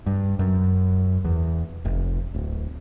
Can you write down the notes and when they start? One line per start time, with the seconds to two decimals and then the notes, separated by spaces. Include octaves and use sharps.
0.06 G2
0.39 F#2
1.25 E2
1.85 F1
2.34 D1